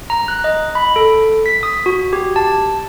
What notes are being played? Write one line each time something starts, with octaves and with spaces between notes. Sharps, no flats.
A#5
F#6
D#5
B5
A4
B6
D#6
F#4
G4
A5